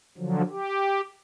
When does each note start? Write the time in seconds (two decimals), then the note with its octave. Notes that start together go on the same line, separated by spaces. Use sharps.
0.18 D3 F3 F#3
0.51 G4